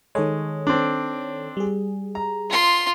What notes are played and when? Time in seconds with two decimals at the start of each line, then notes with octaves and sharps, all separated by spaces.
0.15 D#3 G#3 A4 C#5
0.67 C4 D4
1.57 G3 G#4
2.15 A#5
2.49 F4 C6